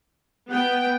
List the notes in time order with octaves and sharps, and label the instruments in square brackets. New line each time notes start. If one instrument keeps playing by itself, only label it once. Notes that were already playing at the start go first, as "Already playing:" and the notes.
[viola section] B3 G5 [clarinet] F#5